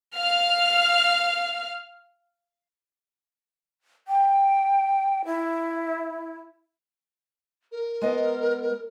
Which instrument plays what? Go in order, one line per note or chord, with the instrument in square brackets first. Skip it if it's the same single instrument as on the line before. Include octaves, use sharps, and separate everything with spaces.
[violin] F5 F6
[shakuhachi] G5
E4
[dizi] A#4
[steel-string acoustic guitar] G#3 B3 D#5